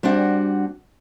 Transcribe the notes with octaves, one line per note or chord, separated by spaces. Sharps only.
G3 C4 D4 F#4 F#5